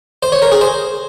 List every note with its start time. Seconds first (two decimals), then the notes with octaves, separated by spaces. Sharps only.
0.23 C5
0.32 C#5
0.42 A#4
0.52 G#4
0.61 C5